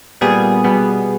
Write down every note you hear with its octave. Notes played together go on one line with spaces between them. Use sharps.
A#2 G3 B3 G#4
B2 G3 B3